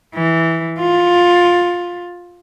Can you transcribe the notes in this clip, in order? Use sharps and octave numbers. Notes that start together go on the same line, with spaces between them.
E3
F4